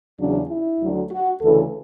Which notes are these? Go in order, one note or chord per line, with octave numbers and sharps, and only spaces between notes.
E2 C#3 F#3 D4
E4
D2 D3 F#3
F#4
D2 C#3 E3 A4